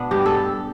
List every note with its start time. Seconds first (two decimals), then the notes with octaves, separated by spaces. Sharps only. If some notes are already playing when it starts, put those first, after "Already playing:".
Already playing: B2 B3 D4
0.11 G2 G4
0.26 A4